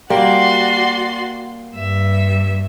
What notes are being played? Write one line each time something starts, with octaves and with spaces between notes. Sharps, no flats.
G3 A#3 F#4 D5 C6
G2 E5